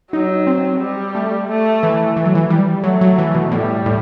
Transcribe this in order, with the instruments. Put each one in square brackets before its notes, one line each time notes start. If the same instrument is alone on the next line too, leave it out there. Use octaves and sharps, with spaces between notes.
[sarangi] F#3 [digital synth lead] D#4
[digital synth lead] C4
[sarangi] G3
[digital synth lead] A3
[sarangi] A3
[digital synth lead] E3
E3
F#3
E3
G3
[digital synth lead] F#3 [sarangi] A3
[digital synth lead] F#3
E3
B2
[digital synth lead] A2 [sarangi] G3
[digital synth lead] A2